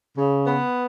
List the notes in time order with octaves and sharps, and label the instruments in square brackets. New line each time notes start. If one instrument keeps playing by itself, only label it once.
[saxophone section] C#3
B3